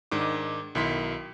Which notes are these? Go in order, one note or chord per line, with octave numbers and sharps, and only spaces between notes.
G#2 D#3 D4 D6
B1 D#3 E4 C6 B6